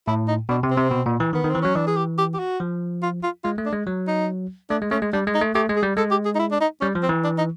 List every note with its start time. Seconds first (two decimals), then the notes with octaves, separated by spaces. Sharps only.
0.07 A2 E4
0.28 D#4
0.49 B2 D4
0.63 C3
0.71 C4
0.77 C3
0.91 B2
1.06 A#2
1.20 E3
1.33 D#3 B3
1.44 D#3
1.49 C4
1.55 E3
1.62 F#3 C#4
1.75 E3 D4
1.87 G#4
1.97 G4
2.18 G4
2.34 G4
2.39 F#4
2.60 F3
3.03 F4
3.23 F4
3.44 G#3 F4
3.58 A3
3.66 D4
3.73 G#3
3.87 F#3
4.07 D#4
4.70 A3 D4
4.82 G#3
4.91 A3 C#4
5.02 G#3
5.13 G3 D4
5.27 G#3
5.35 D#4
5.41 A3
5.55 A3 G4
5.69 G#3
5.76 G#4
5.83 G3
5.97 G#3 A4
6.11 G4
6.25 G#4
6.35 D#4
6.39 E4
6.51 D4
6.61 D#4
6.81 G3 C#4
6.95 F3
7.03 C4
7.09 E3
7.24 D4
7.38 D#4